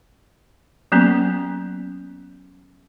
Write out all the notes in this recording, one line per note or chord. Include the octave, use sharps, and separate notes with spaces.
F#3 A#3 B3 C#4